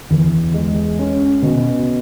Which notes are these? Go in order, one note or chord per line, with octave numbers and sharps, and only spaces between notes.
E2
G#3
C#4
B2